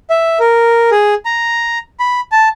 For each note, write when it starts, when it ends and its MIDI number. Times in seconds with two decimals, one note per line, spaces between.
0.10 0.39 76
0.40 0.90 70
0.91 1.14 68
1.25 1.78 82
2.00 2.21 83
2.32 2.49 81